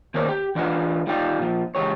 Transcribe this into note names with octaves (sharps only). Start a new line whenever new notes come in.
D#3 A#3 C4 A#4 C#5 D5
G4
E3 D4 F4 B4 F#5
G3 D#4 F4 D5 G5
A#2 F3
C#2 C#3 E3 G4 C#5